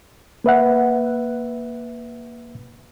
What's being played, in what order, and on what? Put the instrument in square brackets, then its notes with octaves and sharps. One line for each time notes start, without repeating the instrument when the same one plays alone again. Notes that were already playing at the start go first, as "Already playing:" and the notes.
[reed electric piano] A#3 B4 E5 F#5